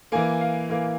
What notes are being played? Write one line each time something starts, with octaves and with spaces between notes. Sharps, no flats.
E3 A#3 G#5
F5
E3 A#3